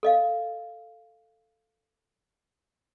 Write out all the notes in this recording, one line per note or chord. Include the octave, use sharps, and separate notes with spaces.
A4 D#5 F5